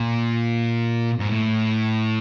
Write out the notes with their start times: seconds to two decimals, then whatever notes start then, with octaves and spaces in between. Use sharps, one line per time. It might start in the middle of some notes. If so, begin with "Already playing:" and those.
Already playing: A#2
1.19 G#2
1.29 A2